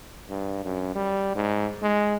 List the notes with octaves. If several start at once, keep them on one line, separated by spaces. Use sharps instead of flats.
G2
F#2
G3
G#2
G#3